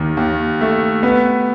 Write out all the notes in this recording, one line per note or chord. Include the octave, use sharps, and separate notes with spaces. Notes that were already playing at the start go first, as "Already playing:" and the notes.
Already playing: D#2 D#3
D#2
A3
B3